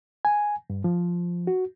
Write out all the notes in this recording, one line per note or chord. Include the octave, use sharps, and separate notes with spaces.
G#5
G2
F3
F#4